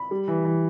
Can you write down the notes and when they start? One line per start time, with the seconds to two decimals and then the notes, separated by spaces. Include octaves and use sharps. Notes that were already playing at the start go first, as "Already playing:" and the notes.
Already playing: B5
0.11 G3
0.28 E3
0.45 E3